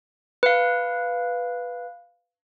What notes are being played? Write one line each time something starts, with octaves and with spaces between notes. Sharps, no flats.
B4 F5